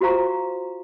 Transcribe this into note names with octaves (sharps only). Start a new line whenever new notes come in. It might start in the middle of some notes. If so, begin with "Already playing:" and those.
F4 F#4 C5 F5 A#5 C#6